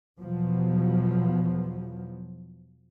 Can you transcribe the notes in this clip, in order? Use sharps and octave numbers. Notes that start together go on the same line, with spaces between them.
E2 B2 F3 F#3